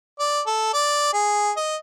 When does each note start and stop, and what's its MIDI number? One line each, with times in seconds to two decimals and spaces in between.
0.19 0.41 74
0.46 0.73 69
0.74 1.11 74
1.13 1.51 68
1.57 1.76 75